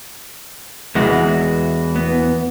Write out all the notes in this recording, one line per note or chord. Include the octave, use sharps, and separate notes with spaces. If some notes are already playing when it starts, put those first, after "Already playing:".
E2 E3 G#3 F#4
B3